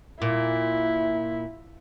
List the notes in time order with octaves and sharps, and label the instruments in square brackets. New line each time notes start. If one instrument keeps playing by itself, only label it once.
[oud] A#2 [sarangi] E4